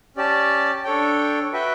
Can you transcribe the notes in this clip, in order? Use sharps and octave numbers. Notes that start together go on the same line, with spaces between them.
C#4 G4 D5 A5
D4 A4 C#5 G5
F#4 B4 E5 G5